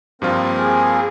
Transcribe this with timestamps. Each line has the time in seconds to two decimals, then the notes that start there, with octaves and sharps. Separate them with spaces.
0.22 G2 F3 A#3 C4 F4 A#4
0.60 G#4